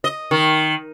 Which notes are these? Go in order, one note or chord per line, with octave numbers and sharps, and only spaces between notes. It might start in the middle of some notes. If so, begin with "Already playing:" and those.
D#5
D#3